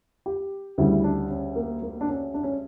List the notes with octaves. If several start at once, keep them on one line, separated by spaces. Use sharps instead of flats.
G4
D2 C#3 G3 E4
D4
C#4
A#3
A#3
D4
C#4
D4
C#4